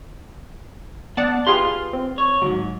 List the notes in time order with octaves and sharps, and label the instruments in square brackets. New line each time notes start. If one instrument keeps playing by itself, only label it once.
[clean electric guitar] B3 [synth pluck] D5 F#5 A5
[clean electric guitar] F4 F5 C6 [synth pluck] G4 G#4 B4
[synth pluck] C4
[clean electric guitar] C#5
[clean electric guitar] D#2 G#2 [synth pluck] F#3